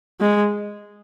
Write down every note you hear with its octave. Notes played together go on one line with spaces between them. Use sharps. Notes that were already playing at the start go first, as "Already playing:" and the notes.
G#3